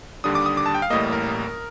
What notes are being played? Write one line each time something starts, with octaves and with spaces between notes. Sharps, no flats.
D#2 D3 G3 D4 D#6
D6
D#6
D6
A5
G5
F5
A1 A2 G3 A#3 D#5
A#4